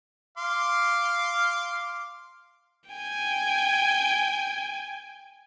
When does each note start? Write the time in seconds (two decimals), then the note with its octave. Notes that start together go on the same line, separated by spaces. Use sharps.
0.38 F5 C6 D6
2.90 G5 G#5